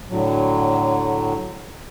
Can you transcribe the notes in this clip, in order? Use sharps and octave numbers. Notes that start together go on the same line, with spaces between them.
A2 D3 F#3